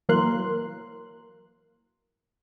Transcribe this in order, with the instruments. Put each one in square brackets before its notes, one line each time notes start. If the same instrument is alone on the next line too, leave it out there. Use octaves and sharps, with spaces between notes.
[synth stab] E3 F#3 A#3 A#4 C6 F#6